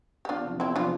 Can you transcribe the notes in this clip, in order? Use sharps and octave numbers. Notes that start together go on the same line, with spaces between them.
G4
E2 D4 F4
C3 F3
E2 C4 E4
C3 F3 D4 F4